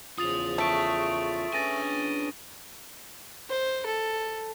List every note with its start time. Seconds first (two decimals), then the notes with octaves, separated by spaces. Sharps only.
0.18 E2 C#3 F4 C5 D#6 A6 F7
0.58 A3 C#6 D7
1.53 C#4 D4 G#4 B4 G#5 A6 A#6 D#7
3.49 C5
3.86 A4